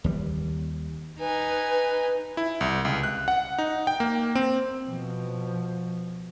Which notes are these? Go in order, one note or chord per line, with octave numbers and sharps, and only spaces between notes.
D#2 G3
D#4 B4 G#5
E4
C2
C#2
F#6
F#5
D#4
G5
A#3
C4
B2 F3